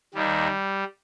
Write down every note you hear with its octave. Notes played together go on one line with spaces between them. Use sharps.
D#2 D#3 G3